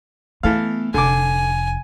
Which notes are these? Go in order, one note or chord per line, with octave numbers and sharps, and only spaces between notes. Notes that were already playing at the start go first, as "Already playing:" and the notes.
E3 A3 B3 A4 F5
F1 D3 G#5 D6